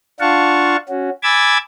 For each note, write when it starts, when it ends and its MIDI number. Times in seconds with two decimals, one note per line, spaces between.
0.20 0.76 62
0.20 0.76 65
0.20 0.76 77
0.20 0.76 78
0.20 0.76 81
0.20 0.76 85
0.89 1.10 61
0.89 1.10 66
1.23 1.58 80
1.23 1.58 83
1.23 1.58 86
1.23 1.58 88
1.23 1.58 92
1.23 1.58 93